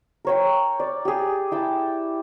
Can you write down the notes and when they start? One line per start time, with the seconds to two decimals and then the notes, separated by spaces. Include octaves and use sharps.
0.25 A#4 C#5 G5
0.80 D5
1.05 G4 G#4
1.51 E4 G5 A5